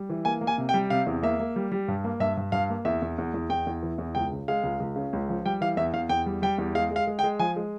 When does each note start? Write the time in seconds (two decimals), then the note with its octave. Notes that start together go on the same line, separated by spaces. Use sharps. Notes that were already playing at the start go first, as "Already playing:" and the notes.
Already playing: G3
0.09 E3
0.25 A#3 G#5
0.41 A#3
0.47 G#5
0.58 C3
0.69 G5
0.74 G3
0.90 C3 F5
1.06 E2
1.23 A#3 E5
1.40 A#3
1.56 G3
1.72 G3
1.88 G2
2.04 A#3
2.20 G2 E5
2.37 G2
2.52 G2 F5
2.70 A#3
2.85 E2 E5
3.02 E2
3.18 E2
3.34 E2
3.50 E2 G5
3.67 E2
3.83 E3
3.98 E2
4.15 C#2 G5
4.32 C#3
4.48 G#3 F5
4.63 C#2
4.80 C#2
4.96 C#3
5.13 C#2
5.29 F3
5.46 G3 G5
5.61 E3 F5
5.77 E2 E5
5.93 E2 F5
6.09 E2 G5
6.26 G3
6.42 G3 G5
6.58 E2
6.75 G#3 F5
6.91 G#3
6.96 F5
7.07 G#3
7.19 G5
7.23 G#3
7.39 F3 G#5
7.56 G#3